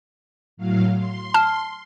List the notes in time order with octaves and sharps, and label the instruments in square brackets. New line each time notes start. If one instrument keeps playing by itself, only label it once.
[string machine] A2 F#3 F5
C6
[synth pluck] A5 F6